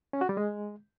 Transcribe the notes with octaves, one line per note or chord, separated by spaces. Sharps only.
C#4
F#4
G3
G#3